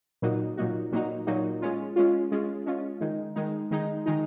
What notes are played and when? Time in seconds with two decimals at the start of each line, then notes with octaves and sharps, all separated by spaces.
0.22 A#2 F#3 A#3 D#4 F#4
0.57 A#2 F#3 A#3 D#4 F#4
0.92 A#2 F#3 A#3 D#4 F#4
1.27 A#2 F#3 A#3 D#4 F#4
1.62 G#3 C#4 F4
1.96 G#3 C#4 F4
2.32 G#3 C#4 F4
2.66 G#3 C#4 F4
3.01 D#3 G#3 D#4
3.36 D#3 G#3 D#4
3.71 D#3 G#3 D#4
4.06 D#3 G#3 D#4